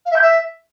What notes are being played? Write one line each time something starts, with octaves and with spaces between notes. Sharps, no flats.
F5
E5
G6
E5